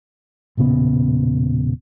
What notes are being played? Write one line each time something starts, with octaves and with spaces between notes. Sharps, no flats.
E1 A#2 C#3 B3